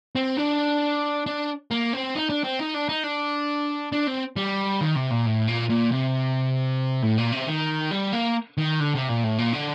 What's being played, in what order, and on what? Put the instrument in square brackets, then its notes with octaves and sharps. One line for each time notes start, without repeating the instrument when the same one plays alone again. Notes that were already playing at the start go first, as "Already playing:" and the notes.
[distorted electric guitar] C4
D4
D4
A#3
C4
D#4
D4
C4
D#4
D4
D#4
D4
D4
C4
G3
D#3
C3
A#2
A2
A#2
A#2
C3
A2
A#2
C3
D#3
G3
A#3
D#3
D3
C3
A#2
A2
A#2
D3